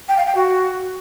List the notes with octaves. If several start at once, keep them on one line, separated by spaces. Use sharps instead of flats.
G5
F5
G5
F#4